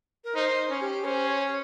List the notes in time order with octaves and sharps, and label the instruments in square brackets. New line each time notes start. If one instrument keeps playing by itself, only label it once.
[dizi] A#4
[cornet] D#4 [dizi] C5
[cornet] C#4
[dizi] G4
[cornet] C#4 [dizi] C5
[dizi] C#5